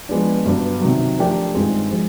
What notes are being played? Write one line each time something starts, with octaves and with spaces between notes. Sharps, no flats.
F3 G#3 B3 D4
G2 D3 F#3 B3
C3 D#3 F#3
F3 A3 D4 G4 A#4
G2 D#3 G#3 C4 F4
F3 G#3